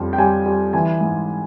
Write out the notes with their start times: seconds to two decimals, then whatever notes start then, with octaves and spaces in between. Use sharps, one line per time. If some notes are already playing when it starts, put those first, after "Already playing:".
Already playing: F2 G3
0.13 G5
0.18 G3 G#5
0.46 G3
0.73 E3 G#5
1.01 G#2